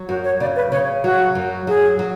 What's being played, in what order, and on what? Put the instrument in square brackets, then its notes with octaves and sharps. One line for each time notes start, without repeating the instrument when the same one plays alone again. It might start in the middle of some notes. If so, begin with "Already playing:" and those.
Already playing: [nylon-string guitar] F#3
[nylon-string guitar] F#2 [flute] F#4
[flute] C#5
[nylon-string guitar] C#3 [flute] D5
[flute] B4
[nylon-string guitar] C#3 [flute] C#5
[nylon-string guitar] F#3 [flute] F#4
[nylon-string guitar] F#2
[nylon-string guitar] F#3 [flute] G#4
[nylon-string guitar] F#3